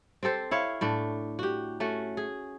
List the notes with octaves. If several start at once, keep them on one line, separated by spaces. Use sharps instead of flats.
C4 G4 A4 C5
E4 C#5 E5 F5
A2 A3 D4
F#4 G4
A3 C#4 F#4
G#4